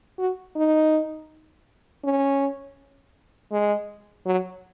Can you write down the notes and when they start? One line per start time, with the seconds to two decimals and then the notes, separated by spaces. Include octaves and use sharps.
0.18 F#4
0.56 D#4
2.04 C#4
3.52 G#3
4.26 F#3